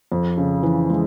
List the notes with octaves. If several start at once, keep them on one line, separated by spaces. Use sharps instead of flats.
F2
C#3
E3
G#3